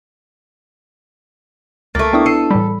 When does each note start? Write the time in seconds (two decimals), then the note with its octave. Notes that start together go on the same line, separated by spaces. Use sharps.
1.95 C#2 A3 A#3 A6
2.13 B3 D4 E4 G5 C#6 D#6
2.26 A4 C7 C#7 D#7
2.51 A2 E3 G3 B5